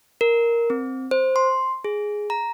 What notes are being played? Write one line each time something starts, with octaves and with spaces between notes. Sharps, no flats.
A#4
C4
C5
C6
G#4
A#5